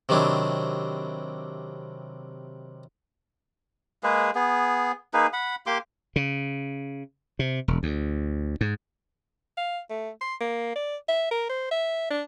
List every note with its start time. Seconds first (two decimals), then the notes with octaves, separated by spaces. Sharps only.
0.09 C3 D#3 F#3 D4 E4
4.03 G#3 A#3 G#4 B4
4.35 B3 G#4
5.14 A#3 D#4 G#4 B4
5.33 F#5 B5
5.66 A#3 G4 C6 D6
6.16 C#3
7.39 C3
7.68 E1
7.83 D2
8.61 G#2
9.57 F5
9.90 A3
10.21 C6
10.40 A#3
10.75 D5
11.08 E5
11.31 A#4
11.49 C5
11.71 E5
12.11 D4